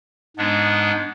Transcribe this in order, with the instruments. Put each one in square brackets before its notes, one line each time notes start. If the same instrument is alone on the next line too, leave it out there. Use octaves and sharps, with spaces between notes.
[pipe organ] G#2 G#3 B3 D4